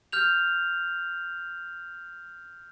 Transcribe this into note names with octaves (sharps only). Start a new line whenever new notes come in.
F6 G6 F7